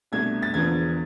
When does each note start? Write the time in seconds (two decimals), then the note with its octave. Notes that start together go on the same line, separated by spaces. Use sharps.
0.12 C2 B2 A3 D4 G#6
0.43 A6
0.54 E1 E2 D3 F3 B3 G#6